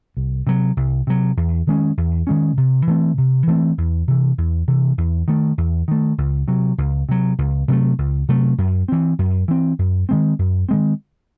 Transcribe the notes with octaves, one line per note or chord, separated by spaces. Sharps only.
C2
C3 F#3
C2
C3 F#3
E2
D#3 G#3 C#4
E2
D#3 G#3 C#4
C3
E3 A3 C4
C3
E3 A3 C4
E2
C3 E3
E2
C3 E3
E2
D#3 A3
E2
D#3 A3
C#2
C3 F#3
C#2
C3 F#3
C#2
C3 F#3 A3
C#2
C3 F#3 A3
F#2
E3 C4
F#2
E3 C4
F#2
D#3 G#3 C4
F#2
D#3 G#3 C4